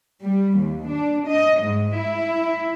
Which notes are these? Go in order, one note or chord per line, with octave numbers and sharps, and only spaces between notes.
G3
D#2
D4
D#5
G#2
E4